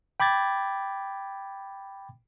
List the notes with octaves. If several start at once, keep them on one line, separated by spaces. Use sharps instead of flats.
G5 B5 D6 G#6 A6